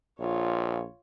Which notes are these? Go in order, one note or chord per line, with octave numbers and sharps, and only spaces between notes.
A#1 F4 C#5